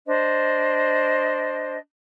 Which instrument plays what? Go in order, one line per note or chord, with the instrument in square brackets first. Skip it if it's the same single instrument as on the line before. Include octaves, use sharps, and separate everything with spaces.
[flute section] D4 C5 D#5